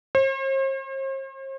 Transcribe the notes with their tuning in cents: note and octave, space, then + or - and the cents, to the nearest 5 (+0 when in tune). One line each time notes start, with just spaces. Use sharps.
C5 +45